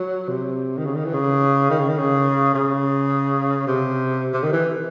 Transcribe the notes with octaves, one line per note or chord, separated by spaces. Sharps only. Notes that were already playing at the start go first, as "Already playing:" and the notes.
Already playing: F#3
C3
D#3
C#3
D#3
E3
C#3
D#3
C#3
D#3
C#3
C#3
C3
C3
D#3
E3